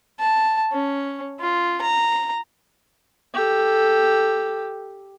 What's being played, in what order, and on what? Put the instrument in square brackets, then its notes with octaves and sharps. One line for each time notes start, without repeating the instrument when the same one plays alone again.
[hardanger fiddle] A5
C#4
F4
A#5
[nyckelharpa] G4 A4